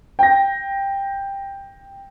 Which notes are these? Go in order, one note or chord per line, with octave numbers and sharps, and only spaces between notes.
G5 A#6